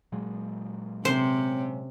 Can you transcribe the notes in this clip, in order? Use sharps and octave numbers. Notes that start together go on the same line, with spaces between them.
A#2 F#3 G#3
C3 C4 C#4 C5